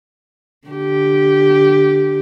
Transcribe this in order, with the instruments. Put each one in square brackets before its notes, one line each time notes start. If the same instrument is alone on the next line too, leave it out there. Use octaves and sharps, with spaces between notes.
[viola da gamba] D3 G4